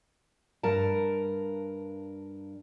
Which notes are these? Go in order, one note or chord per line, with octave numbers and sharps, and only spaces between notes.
G2 A#4 A5